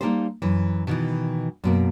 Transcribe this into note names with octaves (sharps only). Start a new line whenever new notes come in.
G3 A#3 D#4 G4 A4 C5
F#2 E3
B2 D#3 E3
F#2 B2 A#3